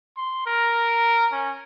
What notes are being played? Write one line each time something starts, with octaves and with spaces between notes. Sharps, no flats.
C6
A#4
C#4